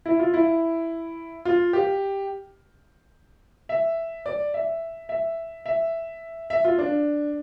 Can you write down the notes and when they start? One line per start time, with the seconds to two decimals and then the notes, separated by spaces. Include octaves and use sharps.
0.06 E4
0.19 F4
0.34 E4
1.45 F4
1.73 G4
3.69 E5
4.26 D5
4.54 E5
5.09 E5
5.66 E5
6.50 E5
6.64 F4
6.78 D4